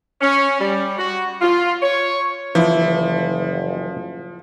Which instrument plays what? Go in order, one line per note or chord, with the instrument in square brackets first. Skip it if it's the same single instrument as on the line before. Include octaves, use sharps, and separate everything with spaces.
[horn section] C#4
G3
F#4
F4
C#5
[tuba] F#1 [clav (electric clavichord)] E3 E4 [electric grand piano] F3